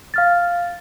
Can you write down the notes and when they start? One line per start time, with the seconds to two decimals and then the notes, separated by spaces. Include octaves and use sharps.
0.14 F5 F6 A6